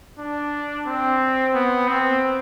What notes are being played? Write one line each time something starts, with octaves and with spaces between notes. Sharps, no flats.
D4
C4
B3
C4